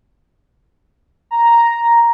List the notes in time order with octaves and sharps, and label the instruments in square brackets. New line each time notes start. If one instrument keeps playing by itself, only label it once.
[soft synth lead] A#5